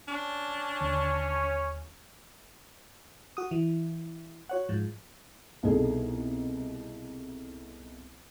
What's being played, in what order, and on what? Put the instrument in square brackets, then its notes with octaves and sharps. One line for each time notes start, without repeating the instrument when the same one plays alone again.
[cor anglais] C#4 [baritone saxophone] D4
[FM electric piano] D#2 D3 [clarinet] C#5
[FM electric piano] F#4 D#6
E3
F#4 C#5 F#5
G#2 F3
[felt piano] C2 B2 D#4 G#4 A4